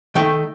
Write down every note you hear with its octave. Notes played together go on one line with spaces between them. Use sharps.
D#3 A3 D#4 G5